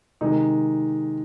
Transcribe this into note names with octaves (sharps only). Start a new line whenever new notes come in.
C3 D#3 G#3 D#4